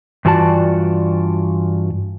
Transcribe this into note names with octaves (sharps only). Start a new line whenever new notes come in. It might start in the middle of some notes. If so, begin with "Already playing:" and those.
G2 E3 F4 F#4 D5 A5